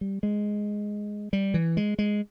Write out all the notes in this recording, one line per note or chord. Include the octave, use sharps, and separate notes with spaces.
G3
G#3
G3
E3
G#3
G#3